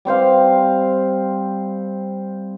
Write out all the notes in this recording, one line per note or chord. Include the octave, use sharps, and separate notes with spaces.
G3 C4 C5 F5